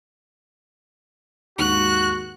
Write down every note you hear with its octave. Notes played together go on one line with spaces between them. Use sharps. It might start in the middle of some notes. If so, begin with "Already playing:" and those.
D#2 G#2 F#4 C#6 F#6